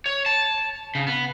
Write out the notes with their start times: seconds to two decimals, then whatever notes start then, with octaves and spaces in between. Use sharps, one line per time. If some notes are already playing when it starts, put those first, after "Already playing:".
0.06 C#5
0.26 A5
0.95 C#3
1.07 B3